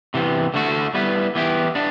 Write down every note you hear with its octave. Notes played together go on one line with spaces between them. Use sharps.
C3 E3 B3
D3 A3 D4 F#4
G3 B3 E4 B4
E3 B3 E4 G4
B3 D4